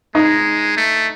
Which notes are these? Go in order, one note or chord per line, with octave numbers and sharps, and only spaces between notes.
G#3 D#4
A3